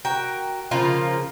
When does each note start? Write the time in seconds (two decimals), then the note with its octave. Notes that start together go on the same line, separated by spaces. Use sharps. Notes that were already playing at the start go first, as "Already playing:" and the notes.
0.05 F#4 A#4 G5
0.71 C#3 F3 A#3 F4